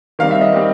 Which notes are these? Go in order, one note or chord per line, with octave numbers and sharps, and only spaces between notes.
D#3 G3 C4 F5
E5
D#5
D#3 G3 C4